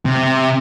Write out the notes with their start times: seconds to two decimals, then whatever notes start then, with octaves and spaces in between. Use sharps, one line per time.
0.05 C3